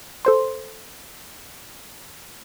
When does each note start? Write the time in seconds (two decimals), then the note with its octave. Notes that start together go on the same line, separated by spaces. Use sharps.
0.25 A4 C5 C6